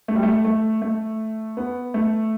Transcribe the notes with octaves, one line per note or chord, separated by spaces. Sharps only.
A3
G3
A3
A3
A3
B3
A3